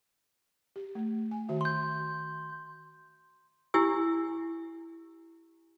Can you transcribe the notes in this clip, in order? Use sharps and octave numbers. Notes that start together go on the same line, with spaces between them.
G4
A3
G#5
D#3 F#4 E5
C6 G6
E4 G4 G#5 E6